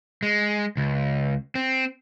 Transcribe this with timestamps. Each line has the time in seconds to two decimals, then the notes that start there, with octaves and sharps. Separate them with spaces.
0.23 G#3
0.77 C#2
1.55 C4